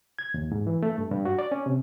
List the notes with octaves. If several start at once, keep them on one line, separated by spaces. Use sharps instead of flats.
G#6
D#2
G#2
E3
A3
G2
G2
F#4
D5
C#4
C3